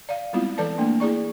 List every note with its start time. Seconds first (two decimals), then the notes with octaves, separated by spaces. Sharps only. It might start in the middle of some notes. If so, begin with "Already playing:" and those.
0.09 D5 F5
0.33 G3 G#3 B3 C4 E4 F4
0.58 E3 A4 B4 D5 A5
0.78 A3 A#3 D4
1.00 E4 G#4 D5 C#6